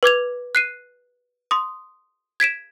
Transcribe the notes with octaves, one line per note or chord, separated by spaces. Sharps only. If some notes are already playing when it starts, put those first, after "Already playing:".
B4 D6 G#6 F7
F#6 C7 D#7
C6 D#6
G#6 B6 D7 E7